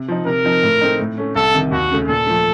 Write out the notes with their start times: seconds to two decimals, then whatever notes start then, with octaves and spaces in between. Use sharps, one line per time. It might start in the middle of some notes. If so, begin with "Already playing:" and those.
Already playing: C3
0.08 F3 C4 D#4
0.26 C3 A#4
0.45 F3 C4 D#4
0.63 A2
0.81 A3 C4 D#4
0.99 A2
1.18 A3 C#4
1.36 C2 A4
1.54 C3 D#3
1.72 D#2 F#4
1.91 C#3 A3
2.08 A#2 A4
2.26 F3 A3